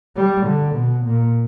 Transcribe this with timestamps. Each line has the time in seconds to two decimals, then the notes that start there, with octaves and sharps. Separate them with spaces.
0.16 G3
0.46 D3
0.75 B2
1.05 A#2